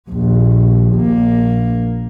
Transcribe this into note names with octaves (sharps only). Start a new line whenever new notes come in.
A#1 D#2
A#1 A#3